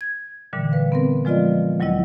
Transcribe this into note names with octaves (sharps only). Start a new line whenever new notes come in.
G#6
A#2 D3 E3 G3
B4 F5
B3 C4 A#4
F3 G#3 F4 D5 D#5
D2 F#3 G3 E4 D#5